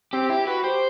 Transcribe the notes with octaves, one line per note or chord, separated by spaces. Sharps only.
C4 G4
E4 G4
F#4 B4
G4 C5